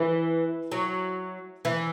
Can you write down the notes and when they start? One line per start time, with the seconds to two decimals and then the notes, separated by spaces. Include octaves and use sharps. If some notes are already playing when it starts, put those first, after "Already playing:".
Already playing: E3
0.72 F#3
1.65 E3